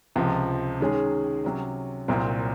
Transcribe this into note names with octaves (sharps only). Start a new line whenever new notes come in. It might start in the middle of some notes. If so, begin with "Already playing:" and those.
C#2 C3 F3
D#3 G#3 C#4 G#4
C3 F#3 C#4
C2 A#2 F#3 C4